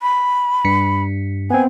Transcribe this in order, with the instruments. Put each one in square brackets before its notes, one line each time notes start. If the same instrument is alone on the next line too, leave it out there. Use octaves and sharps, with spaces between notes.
[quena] B5
[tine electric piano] G2 B6 C#7
[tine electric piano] B3 C4 [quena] G#5